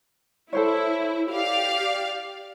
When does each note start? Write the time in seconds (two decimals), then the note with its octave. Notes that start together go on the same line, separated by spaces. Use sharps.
0.53 E4 A4 C5 C#5
1.32 G4 D5 F5